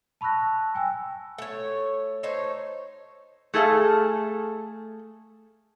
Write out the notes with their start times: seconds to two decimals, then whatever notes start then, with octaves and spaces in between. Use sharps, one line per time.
0.21 A5 B5 C#6 E6 F#6 A#6
0.75 G5 G#5 E6
1.38 A3 C#5
2.23 D#4 A4 C5 C#5
3.54 A3 G#4 A4 E5 F5